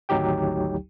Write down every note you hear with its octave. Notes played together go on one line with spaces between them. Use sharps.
G#1 D2 F#3 D#4 G4 G5